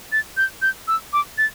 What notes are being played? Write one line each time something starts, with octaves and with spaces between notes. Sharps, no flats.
A6
G6
G6
E6
D6
A6